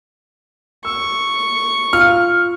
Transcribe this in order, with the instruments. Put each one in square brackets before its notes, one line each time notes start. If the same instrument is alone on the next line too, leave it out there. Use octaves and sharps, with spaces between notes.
[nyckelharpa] C#6 [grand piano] E6
[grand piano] F4 [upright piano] F6